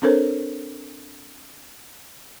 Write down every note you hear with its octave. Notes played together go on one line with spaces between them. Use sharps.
C4 D4 A4 A#4 C5 C#5